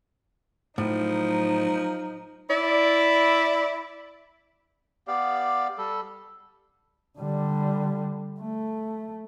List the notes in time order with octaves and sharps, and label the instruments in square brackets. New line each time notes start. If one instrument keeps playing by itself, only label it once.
[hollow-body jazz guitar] A2 [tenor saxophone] F3 [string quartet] F#3 D#4
[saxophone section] E4 D5
[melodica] B3 G4 D5 F5
G3 A4
[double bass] D3 G3
A3